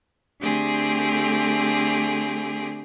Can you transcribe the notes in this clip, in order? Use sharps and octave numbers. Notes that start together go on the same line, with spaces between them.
D3 A3 C4 G4 G#4